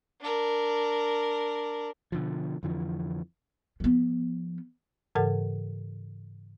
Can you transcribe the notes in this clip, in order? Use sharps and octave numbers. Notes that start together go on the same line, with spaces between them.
D4 A#4
B2 D3 F3
F2 D3 E3 F3
F3 B3
G#2 C#3 E3 A4 A#4 F#5